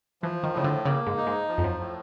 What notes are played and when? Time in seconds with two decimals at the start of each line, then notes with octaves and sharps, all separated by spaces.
0.22 E3 F3
0.43 D#3
0.54 A2 C#3
0.64 D3
0.85 C#3 A#3
1.07 G#2
1.17 D#4
1.27 G#2
1.48 F3
1.58 F2
1.64 F#2
1.79 A2